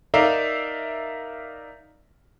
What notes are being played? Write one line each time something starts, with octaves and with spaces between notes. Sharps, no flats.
D#4 A#4 D5 E5 F5